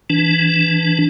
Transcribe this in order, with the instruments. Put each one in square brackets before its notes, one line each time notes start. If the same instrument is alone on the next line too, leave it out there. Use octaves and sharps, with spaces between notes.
[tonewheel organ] E3 D4